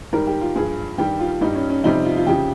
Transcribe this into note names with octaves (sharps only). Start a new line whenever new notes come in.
G#2 D#3 G3 A#4
G4
F4
G2 F3 G#4
G2 D#3 G3 G4
F4
G2 G3 D#4
C#4
C#4
F2 C3 G3 D#4
F4
F4
F2 C#3 F3 G4